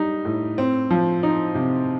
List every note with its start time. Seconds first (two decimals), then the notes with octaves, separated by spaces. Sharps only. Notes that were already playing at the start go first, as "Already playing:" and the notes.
Already playing: G3 D#4
0.25 A2
0.58 C4
0.90 F3
1.23 D#4
1.55 C3